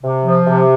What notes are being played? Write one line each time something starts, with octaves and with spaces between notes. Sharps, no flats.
C3
F3
C3